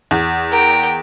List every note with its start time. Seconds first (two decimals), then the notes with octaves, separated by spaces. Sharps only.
0.11 E2
0.50 A#4 G5